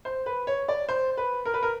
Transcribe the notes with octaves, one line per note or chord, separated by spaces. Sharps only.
C5
B4
C#5
D5
C5
B4
A#4
B4
A#4